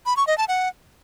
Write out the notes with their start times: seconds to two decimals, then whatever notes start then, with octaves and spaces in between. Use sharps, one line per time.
0.06 B5
0.17 C#6
0.27 D#5
0.38 A5
0.48 F#5